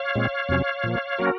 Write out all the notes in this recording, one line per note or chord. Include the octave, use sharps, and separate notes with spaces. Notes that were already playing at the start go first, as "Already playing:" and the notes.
Already playing: C#5 F5
A#2 G#3 C4
F2 C3 F#3 C#4
A#2 F3 A#3
F#3 A#3 C#4 F#4 A#4